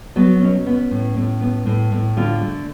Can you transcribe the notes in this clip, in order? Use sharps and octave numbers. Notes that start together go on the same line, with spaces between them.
F#3 B3
B2 C#4
B3
A2
A2
B3
A2
A2
D3 F4
A3